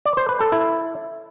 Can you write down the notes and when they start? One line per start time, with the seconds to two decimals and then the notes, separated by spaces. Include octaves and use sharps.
0.05 D5
0.17 C5
0.29 B4
0.40 A4
0.52 E4